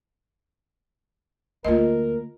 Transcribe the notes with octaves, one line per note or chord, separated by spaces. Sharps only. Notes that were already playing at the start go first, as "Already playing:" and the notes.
D2 A#3 F4 A#4 D#5